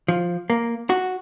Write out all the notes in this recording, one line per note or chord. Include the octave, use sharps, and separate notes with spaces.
F3
A#3
F#4